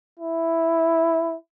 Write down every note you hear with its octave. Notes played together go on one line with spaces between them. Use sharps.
E4